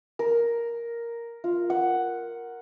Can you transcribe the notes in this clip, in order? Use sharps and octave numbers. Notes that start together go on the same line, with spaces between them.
A#4
F4
F#5